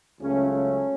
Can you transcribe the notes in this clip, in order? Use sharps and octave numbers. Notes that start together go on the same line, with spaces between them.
C#2 C#3 F#3 A3 C#4
C#4